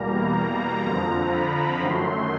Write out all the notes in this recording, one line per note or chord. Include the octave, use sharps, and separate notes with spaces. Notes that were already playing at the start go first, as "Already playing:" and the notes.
Already playing: E2 B2 G3 A#3 A#5
F2 D3 F3
B5
F#2 D#3 F#3 A3 C6